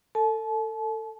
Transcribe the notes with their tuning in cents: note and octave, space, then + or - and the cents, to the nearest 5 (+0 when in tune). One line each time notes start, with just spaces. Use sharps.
A4 +25 A5 -35